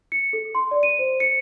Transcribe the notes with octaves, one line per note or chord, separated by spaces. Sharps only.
C#7
A4
C6
D5
D#7
C5
C#7